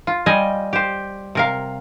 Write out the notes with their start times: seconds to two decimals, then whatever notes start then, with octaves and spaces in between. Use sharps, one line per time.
0.07 F4
0.26 G3 D#5 G#5
0.73 G4 C5
1.35 C3 A#4 F5